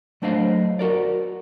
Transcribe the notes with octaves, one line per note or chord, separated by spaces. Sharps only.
F#3 A3 D4 C5 D#5 F5
F#4 A#4 D5